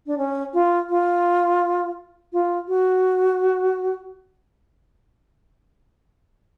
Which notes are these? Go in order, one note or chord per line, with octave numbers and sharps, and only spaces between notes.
D4
C#4
F4
F4
F4
F#4